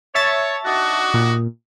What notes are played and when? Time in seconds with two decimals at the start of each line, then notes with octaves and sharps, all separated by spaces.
0.15 C#5 E5 A5 A6
0.65 D4 D#4 F#4
1.14 A#2